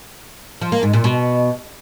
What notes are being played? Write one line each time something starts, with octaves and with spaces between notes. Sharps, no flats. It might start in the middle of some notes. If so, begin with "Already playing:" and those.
F3
A#3
G#2
A#2
B2